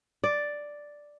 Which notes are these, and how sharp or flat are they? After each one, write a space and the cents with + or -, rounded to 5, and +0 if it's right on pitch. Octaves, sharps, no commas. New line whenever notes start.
D5 +0